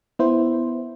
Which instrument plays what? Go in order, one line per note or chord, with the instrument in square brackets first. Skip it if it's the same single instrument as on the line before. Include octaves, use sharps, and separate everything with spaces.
[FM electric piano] B3 E4 C5